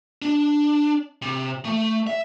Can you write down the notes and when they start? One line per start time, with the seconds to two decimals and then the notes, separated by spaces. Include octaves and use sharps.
0.22 D4
1.22 C3
1.65 A3
2.07 E5